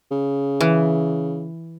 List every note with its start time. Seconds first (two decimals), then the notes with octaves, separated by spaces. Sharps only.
0.11 C#3
0.61 E3